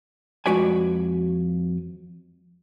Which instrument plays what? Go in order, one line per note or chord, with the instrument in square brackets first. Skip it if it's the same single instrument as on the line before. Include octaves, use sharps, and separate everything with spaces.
[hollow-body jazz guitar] F2 G#3 F#4 B4 D5 G#5